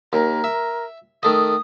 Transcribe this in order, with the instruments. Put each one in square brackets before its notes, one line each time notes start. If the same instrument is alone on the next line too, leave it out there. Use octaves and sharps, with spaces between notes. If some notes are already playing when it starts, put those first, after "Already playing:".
[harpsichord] D#2 [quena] A#4
[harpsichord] E5
[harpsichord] D#3 A3 D#5 [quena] D#6